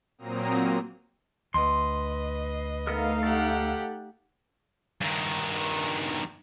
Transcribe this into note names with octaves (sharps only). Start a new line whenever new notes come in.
A#2 F#3 A#3 C4 A#5 D#6
D2 B4 D#5 C6
A3 B3 D#4 A4 A#4 F5
G4 A4 F#5
G2 D#3